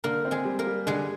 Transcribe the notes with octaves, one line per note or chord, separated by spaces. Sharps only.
D3 A#3 A#4
C4
G#3 G#4
G3
A#3 A#4
G3
D3 G#3 G#4